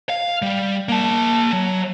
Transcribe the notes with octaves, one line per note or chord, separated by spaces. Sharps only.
F5
G3
A#3 A5
F#3